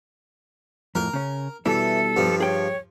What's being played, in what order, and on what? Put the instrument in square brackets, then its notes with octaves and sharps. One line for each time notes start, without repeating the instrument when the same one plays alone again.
[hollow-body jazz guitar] F2 A2 [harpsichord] A#4
[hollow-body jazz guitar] C#3 C#4
[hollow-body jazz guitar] B2 G3 E4 [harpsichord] E3 [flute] A4
[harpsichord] G2 F3
[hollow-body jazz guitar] G#4 G5 [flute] C#5